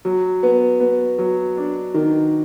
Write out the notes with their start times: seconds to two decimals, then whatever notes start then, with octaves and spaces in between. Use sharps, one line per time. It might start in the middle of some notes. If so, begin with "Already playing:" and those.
0.05 F#3
0.43 B3
0.80 B3
1.18 F#3
1.57 D4
1.94 D#3